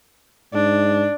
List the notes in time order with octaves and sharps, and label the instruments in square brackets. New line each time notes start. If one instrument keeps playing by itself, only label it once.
[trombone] G#2 [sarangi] D4